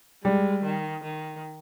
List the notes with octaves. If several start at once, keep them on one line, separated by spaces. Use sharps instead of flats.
G3 G#3
D#3
D#3